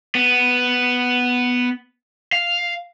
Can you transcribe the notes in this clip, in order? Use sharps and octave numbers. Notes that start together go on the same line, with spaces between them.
B3
F5